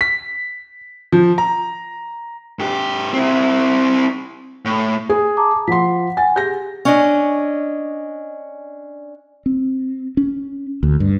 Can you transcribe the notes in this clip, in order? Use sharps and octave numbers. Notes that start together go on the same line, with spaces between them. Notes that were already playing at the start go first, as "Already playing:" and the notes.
B6
F3
A#5
G#2 G4
C4 E4
A2
G#4
A5 A#5 D6
F3 F#5 C6 B6
F#5 G#5 A6
G4 G#4 G6 A#6
C#4 D4 D#5
C4
C#4
D2
G2